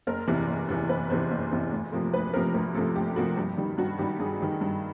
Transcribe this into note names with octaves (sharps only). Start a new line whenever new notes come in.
F#1 A#4
E2 C3 E3
F#1
E2 C3 E3
F#1 B4
E2 C3 E3 C5
F#1
E2 C3 E3
D2
C3 F3 A#3
D2 B4
C3 F3 A#3 A#4
D2 A#4
C3 F3 A#3 A4
D2 G4
C3 F3 A#3 F#4
G2 G4
D#3 G3
G2 F#4
D#3 G3 G4
G2 G#4
D#3 G3
G2